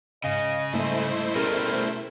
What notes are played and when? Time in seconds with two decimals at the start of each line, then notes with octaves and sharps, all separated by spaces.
0.24 G#2 C#3 D#5 F5
0.73 G#2 G3 A3 A#3 E4 C5 D#5
1.35 B2 G3 C#4 G#4 A#4